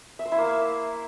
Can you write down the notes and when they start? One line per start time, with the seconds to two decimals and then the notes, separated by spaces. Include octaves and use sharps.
0.19 E5
0.26 C5
0.32 E4
0.38 A#3